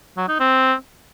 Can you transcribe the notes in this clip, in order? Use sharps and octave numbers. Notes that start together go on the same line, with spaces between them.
F#3
D#4
C4